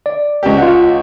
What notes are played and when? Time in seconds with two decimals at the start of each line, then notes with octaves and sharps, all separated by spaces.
0.06 D5
0.43 C#2 G4
0.58 F4 F#5